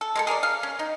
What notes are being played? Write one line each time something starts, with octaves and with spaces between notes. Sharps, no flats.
A4
G#3 A#3 A4
G#4 A#4 C#5 D5
F5
C#4
D#4